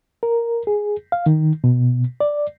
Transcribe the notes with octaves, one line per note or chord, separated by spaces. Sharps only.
A#4
G#4
F5
D#3
B2
D5